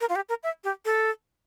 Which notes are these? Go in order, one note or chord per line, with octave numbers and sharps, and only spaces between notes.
A#4
F4
G4
A#4
E5
G4
A4